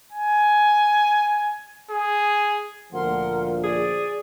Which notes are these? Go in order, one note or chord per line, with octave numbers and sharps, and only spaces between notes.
G#5
G#4
D2 A#2 F3 F4 A#4 F#5 C6
G#4 D5